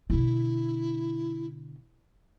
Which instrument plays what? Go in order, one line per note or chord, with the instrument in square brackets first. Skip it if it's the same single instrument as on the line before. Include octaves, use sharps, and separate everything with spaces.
[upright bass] B2 D3 [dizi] E4